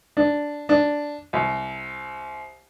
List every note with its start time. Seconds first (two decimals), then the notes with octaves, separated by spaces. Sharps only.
0.17 D4
0.69 D4
1.33 C2